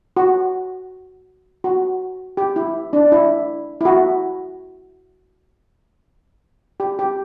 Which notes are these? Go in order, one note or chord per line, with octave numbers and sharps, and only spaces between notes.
F#4
F#4
G4
E4
D4
E4
E4
F#4
G4
G4